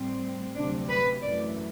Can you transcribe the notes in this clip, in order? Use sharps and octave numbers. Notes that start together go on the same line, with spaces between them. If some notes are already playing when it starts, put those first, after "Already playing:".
Already playing: A2 G3 C4
D2 C3 F#3 D4
B4
F#2 E3 A3 D5